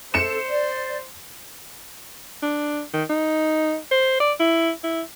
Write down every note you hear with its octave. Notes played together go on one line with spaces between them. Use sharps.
A4 C5 C#7 E7
D5
D4
D#3
D#4
C5
D5
E4
E4